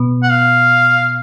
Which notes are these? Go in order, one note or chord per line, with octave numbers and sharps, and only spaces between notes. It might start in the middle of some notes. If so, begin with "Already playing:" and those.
Already playing: B2 B3
F#5
F5